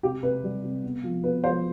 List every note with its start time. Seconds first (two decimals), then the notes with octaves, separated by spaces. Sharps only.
0.03 C3 G4
0.23 C3 B4
0.44 G3
0.64 C3
0.84 B3
1.04 F3
1.23 B3 B4
1.44 F3 C5